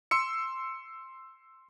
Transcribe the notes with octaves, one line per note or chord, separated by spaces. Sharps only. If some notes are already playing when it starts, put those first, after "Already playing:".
C6 E6 C#7